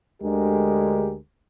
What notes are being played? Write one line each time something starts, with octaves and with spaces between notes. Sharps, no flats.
D2 D3 G#3 G4 G#4 A#4